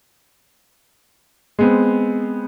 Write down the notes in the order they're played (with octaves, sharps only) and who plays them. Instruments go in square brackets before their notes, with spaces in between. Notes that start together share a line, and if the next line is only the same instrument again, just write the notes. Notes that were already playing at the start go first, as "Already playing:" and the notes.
[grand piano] G#3 B3 C4